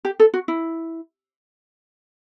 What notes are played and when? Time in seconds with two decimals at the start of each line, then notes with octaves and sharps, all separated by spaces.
0.05 G4
0.20 A4
0.34 F#4
0.48 E4